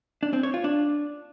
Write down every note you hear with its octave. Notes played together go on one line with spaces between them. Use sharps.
D4
C4
C#5
F4
D4